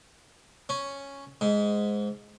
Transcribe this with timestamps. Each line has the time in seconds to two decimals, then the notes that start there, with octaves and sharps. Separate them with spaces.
0.69 C#4
1.41 G#2